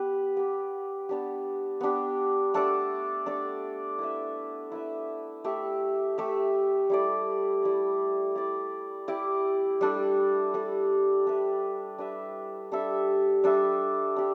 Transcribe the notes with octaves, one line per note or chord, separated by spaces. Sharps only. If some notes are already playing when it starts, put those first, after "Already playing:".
Already playing: B3 G4 B4
B3 G4 B4
B3 D4 G4
B3 D4 G4
A3 D4 A4 D5
A3 D4 A4 D5
E4 B4 E5
E4 B4 E5
A3 G4 E5
A3 G4 E5
G3 E4 A4 D5
G3 E4 A4 D5
E4 G4 D5
E4 G4 D5
G3 D4 A4
G3 D4 A4
D4 G4 B4 E5
D4 G4 B4 E5
G3 D4 A4 E5
G3 D4 A4 E5
D4 G4